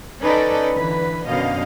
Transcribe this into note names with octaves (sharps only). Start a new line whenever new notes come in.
C#4 D#4 A4 B4 D5
D3 E3 B4
F#2 B2 D3 F#3 D#5 F5